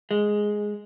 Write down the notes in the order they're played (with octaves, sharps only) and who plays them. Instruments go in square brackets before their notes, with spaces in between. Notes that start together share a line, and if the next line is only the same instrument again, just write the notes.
[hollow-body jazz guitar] G#3